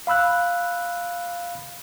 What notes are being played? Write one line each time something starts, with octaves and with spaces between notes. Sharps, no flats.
F5 B5 E6 F#6